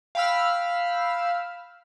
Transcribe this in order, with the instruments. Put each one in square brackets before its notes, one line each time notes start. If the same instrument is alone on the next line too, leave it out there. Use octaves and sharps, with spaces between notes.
[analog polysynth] F5 G5 B5 E6 F6